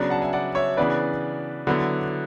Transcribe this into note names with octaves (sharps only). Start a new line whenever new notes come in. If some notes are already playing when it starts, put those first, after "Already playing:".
Already playing: C#3 F#3 B3 D4
F#5 A5
E5 G#5
D5 F#5
C#5 E5
C#3 E3 B3 D4 B4 D5
D3 F#3 B3 E4